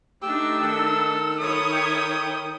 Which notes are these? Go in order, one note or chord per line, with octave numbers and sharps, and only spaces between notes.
A3 D4 D#4 G4 E6
D#3 A4
E4 A4 C#5 D#6
G5